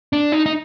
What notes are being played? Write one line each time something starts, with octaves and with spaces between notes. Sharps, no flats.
D4
D#4
D#4